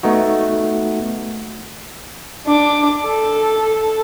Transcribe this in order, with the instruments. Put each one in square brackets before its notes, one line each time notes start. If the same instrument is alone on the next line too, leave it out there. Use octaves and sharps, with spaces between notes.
[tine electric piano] A3 B3 D#4 F#4
[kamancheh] D4 D6
A4